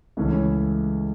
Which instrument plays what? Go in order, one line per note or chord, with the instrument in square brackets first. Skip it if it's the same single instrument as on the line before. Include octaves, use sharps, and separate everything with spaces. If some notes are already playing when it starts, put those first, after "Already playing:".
[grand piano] C#2 C#3 E3 A3 C#4